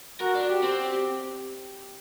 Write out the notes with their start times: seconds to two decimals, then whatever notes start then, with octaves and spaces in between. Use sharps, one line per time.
0.20 F#4 A#4
0.35 D4
0.49 G4
0.63 C4
0.78 G4